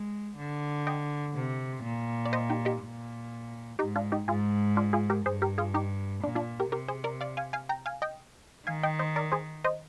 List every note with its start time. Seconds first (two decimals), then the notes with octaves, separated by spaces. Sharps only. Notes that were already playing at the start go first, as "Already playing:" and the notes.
Already playing: G#3
0.38 D3
0.87 D#5 G5
1.36 C3
1.84 A#2
2.26 D5
2.33 C5 D#5
2.50 D#4 G4
2.65 D#4 G4
2.82 A#2
3.79 G#2 D#4 G4
3.96 D4 F4
4.12 D#4 G4
4.28 G#2 F4 G#4
4.77 D4 F4
4.93 F4 G#4
5.10 G4 A#4
5.26 G2 G#4 C5
5.42 G4 A#4
5.58 F4 G#4
5.74 D#4 G4
6.23 A#2 D4
6.35 D4 F4
6.60 G4 A#4
6.71 C3 G4 A#4
6.88 G#4 C5
7.04 A#4 D5
7.21 D5 F5
7.37 F5 G#5
7.53 F5 G#5
7.69 G5 A#5
7.86 F5 G#5
8.02 D#5 G5
8.67 D#3 F5 G#5
8.83 D#5 G5
8.99 C5 D#5
9.16 A#4 D5
9.32 G#4 C5
9.64 C5 D#5